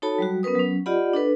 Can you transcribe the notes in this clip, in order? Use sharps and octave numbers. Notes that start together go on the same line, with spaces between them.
D#4 F#4 A4 C#5 A5 B5
F#3 G3 F#4
B3 C#4 A#4 B4 D#6
F#3 C#4
F4 G4 D5 D#5 F#5 B5
D4 A4 B4